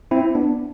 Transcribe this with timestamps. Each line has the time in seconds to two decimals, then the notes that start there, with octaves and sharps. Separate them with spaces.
0.11 C4 E4
0.35 B3 D4